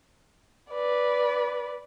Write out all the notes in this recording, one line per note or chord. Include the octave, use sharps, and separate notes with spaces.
B4 D5